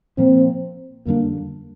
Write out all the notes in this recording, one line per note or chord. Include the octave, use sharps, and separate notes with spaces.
A#2 F3 A#3 C4
F2 D3 G3 A#3 D4